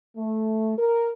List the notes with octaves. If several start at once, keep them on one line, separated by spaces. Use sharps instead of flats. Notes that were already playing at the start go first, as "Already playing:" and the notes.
A3
A#4